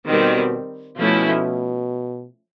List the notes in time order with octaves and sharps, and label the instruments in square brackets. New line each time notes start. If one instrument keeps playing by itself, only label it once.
[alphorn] B2 [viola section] D#3 G3 C4
[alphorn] B2 [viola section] F3 A3 C#4 E4